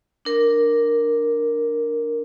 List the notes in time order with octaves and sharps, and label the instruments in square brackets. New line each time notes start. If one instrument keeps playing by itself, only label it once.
[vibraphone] D4 A#4